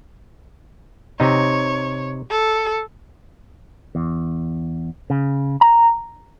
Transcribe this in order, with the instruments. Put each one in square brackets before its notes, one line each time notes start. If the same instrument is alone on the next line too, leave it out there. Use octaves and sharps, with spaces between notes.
[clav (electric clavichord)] C3 D#4 [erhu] C#5
[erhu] A4
[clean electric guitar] E2
C#3
A#5